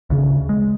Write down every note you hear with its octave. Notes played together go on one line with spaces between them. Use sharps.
D2 C#3
G#3